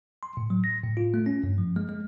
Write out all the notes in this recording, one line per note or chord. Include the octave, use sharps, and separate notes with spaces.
C6
A2
F#3
A#6
A2
F4
A3
C#4
G2
F3
G#3
G#3